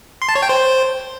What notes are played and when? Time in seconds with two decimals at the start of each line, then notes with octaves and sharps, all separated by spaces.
0.22 C6
0.29 A5
0.36 C#5
0.42 G5
0.49 C5